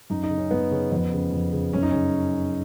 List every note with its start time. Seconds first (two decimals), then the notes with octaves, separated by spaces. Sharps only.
0.10 F#2 D#4
0.23 D#4
0.30 C#3
0.38 C#4
0.51 F#2 B3
0.71 C#3 C#4
0.92 F2 B3
1.13 C#3
1.32 F2
1.53 C#3
1.73 F#2 C#4
1.83 D#4
1.91 C#3 C#4